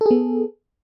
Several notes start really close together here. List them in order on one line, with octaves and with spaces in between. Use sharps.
A4 G#4 B3